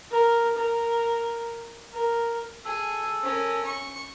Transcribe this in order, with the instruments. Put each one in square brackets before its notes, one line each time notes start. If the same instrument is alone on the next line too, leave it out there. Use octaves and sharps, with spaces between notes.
[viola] A#4
A#4
A#4
[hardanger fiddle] G#4 [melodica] A4
[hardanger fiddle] C#4 A#4
C#6